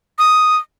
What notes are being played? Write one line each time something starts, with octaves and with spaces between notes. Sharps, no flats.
D#6